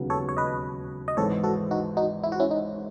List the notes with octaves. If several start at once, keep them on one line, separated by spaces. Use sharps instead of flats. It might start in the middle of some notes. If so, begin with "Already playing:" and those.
Already playing: E1 D#2 C#3 F#3 B3
A4 C#5
C#5
B4 D#5
D#5
G#1 G#2 E3 G#3 A4 C#5
F#4 A4
D#4 F#4
D#4 F#4
E4
F#4
C#4 E4
D#4